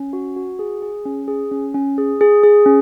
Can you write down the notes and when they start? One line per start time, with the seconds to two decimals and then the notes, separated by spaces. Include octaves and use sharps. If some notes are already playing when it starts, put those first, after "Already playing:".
Already playing: C#4
0.13 F#4
0.36 F#4
0.59 G#4
0.82 G#4
1.05 C#4
1.28 G#4
1.51 C#4
1.75 C#4
1.98 G#4
2.21 G#4
2.44 G#4
2.66 C#4